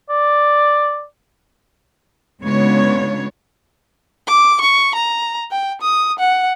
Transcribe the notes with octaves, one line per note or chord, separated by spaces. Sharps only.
D5
C#3 G#3 B3 D4 F4 C#5
D6
C#6
A#5
G5
D#6
F#5